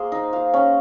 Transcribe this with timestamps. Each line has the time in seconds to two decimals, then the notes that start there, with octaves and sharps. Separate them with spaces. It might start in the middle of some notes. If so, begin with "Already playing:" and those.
Already playing: A#3 G#4 C5
0.12 D#4
0.33 F5
0.54 C#4